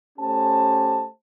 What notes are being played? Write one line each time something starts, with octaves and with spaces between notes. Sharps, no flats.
A3 C#4 G4 C5 A5